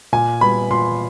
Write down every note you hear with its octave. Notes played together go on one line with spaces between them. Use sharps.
A#2 G#5
G3 B3 B5
A#2 C6